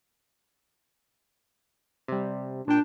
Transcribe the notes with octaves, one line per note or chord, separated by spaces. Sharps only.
C3 G3
A#2 D4 G5